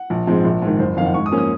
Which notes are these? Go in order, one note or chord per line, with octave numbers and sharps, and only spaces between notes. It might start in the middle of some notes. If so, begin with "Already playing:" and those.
Already playing: F#5
A#1
G#2 F3 G#3 C4
A#1
G#2 D#3
F#1 C5
F2 D#3 F5
F#5
G#2 C#6
D#6
F3 A#3 C#4
D#6